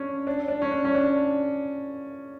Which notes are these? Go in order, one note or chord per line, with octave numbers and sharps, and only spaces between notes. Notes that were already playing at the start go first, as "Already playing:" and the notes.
Already playing: C#4 D4
D4
D4
C#4
D4
C#4
D4